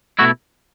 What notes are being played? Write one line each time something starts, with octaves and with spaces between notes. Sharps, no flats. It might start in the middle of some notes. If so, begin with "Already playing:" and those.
B2 A3 E4 F#4